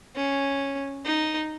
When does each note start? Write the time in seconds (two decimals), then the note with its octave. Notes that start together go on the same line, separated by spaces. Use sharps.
0.15 C#4
1.05 D#4